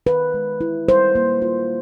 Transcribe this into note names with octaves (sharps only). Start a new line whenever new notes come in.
D#3 B4
G#3
E4
G3 C5
A#3
F4